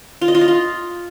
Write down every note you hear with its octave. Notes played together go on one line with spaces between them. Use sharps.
F4
D#5
F4
D#5
F4